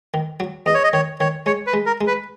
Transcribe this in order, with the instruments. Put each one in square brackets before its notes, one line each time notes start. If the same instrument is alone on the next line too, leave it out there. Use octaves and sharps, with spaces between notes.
[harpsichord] D#3
F#3
[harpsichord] E2 [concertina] D#5
[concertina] C#5
D#5
[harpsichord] D#3 [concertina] C#5
[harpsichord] D#3 [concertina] C#5
[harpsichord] G#3 [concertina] C#5
[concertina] B4
[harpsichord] G#3
[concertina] A#4
[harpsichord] G#3
[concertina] B4